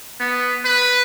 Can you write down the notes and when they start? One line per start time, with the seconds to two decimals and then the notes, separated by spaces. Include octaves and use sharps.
0.20 B3
0.65 B4